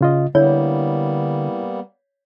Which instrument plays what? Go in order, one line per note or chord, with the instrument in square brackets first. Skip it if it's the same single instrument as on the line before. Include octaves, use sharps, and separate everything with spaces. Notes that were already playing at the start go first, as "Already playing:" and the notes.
[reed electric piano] C#3 F4 D#5
[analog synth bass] D3 [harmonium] G3 A#3 B3 [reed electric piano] E4 [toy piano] C#5